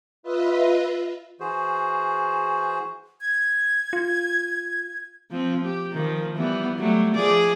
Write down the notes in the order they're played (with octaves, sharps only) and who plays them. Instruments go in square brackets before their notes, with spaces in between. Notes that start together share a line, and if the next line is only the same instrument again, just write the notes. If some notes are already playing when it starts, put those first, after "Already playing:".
[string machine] F4 B4 D#5 E5
[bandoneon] E3 F#4 G#4 C5
[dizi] G#6
[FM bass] F4
[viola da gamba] F3 C4
G4
D#3 F3
E3 G3 B3
F#3 G3 A3
F3 G#4 D5